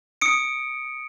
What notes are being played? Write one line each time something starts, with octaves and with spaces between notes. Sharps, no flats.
D#6 C#7 D7